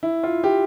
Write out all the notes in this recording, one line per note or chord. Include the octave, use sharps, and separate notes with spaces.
E4
F4
G4